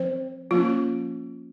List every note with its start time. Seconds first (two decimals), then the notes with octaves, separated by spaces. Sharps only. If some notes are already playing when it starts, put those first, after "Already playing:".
Already playing: F3 C4 C5
0.51 F3 A#3 C#4 F4